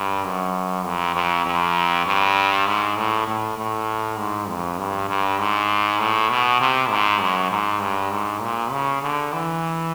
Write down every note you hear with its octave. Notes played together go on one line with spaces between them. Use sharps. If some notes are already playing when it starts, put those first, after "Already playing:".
Already playing: G2
F#2
F2
F2
F2
G2
G#2
A2
A2
A2
G#2
F2
G2
G2
G#2
A2
B2
C3
G#2
F#2
G#2
G2
G#2
A#2
C#3
D3
E3